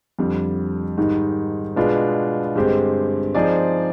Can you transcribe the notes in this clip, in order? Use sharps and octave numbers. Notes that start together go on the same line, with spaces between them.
F2 D3 G3
G#2 D#3 G3
B2 G#3 B3 D4 F4
G2 D3 G#3 C4 G4
F3 C4 D#4 G#4 D5